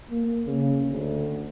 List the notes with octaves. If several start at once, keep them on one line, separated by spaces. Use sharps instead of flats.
A#3
C#3
D2